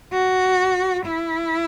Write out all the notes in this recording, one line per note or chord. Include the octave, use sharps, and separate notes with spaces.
F#4
E4